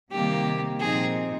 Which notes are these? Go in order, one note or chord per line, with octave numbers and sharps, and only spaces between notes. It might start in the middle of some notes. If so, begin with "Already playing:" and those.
C3 D#3 G3 A#3 G4
A#2 F3 C4 D#4 G#4